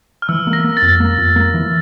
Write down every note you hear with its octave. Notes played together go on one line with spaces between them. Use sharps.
F6
E3 E6
A#3
A#6
A#3
A6
F2
A#3
F2
A#3
E3